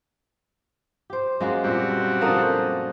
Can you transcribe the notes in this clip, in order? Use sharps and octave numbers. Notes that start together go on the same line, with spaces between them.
G4 C5
F#2 G#3 A#3 F#4
A#2 G3 B3 C4 F#4
D3 F3 A#3 A4 A#4 D#6